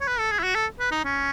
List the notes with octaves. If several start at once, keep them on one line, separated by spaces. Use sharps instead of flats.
C#5
B4
A4
G#4
E4
F#4
A4
B4
D#4
C#4